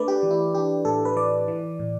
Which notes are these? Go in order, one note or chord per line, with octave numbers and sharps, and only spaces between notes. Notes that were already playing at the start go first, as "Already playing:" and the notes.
Already playing: A3 D4 B4 D5
G4
E3
E4
D4 G4
A2 A4
B4
E3 D5
E3
A2